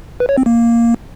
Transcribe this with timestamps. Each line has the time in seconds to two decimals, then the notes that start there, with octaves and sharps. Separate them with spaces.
0.20 B4
0.29 C#5
0.37 C4
0.46 A#3